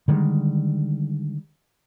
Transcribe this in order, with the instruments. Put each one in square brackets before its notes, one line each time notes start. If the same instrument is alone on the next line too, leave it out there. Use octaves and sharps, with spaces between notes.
[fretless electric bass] D3 D#3 G3 G#3